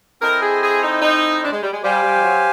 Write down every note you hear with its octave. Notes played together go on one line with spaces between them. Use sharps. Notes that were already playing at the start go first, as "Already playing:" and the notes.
C4 E4 A4 A#4 C5 D#5
G#4
G#4
D#4
D#4
D4
G#3
G3
G#3
G3 G4 C5 F5 G#5
G3
F3
F#3